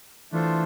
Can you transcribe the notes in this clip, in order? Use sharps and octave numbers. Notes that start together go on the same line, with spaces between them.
E3 A3 D4 F4 A4 C5